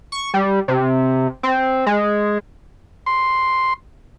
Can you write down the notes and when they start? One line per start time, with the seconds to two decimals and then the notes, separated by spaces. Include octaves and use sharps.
0.12 C#6
0.34 G3
0.68 C3
1.43 C4
1.86 G#3
3.06 C6